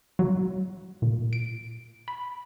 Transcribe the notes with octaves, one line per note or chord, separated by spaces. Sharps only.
F#3
A#2
D7
B5